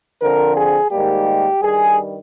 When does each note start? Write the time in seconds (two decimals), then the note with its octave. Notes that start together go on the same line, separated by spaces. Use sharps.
0.21 D3 F3 C4 A#4
0.56 G#4
0.91 G#2 D#3 G3 A#3 G4
1.61 G2 D#3 G3 G#4